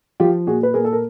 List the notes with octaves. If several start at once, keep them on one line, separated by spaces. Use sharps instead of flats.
F3 F4 G4
A#2 F#4 G#4
B4
A#2 G#4 A#4
A4
A#4